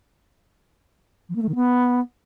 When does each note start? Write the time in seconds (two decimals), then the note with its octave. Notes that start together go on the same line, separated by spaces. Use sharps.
1.29 F3
1.36 A#3
1.42 A3
1.49 D#3
1.55 B3